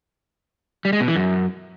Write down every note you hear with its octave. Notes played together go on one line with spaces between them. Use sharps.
G3
G#3
B2
E3
F#2